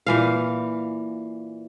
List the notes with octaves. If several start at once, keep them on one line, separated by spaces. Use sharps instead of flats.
A#2 E3 F5